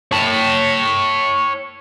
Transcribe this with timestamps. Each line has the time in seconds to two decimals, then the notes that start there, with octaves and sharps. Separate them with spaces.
0.11 C#5 A5